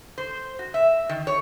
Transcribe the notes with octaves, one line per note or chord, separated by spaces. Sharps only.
C5
F#4
E5
D#3
C#5